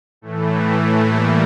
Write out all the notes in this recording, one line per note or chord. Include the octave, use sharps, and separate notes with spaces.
A2 E3 A3
A3
G3 A#3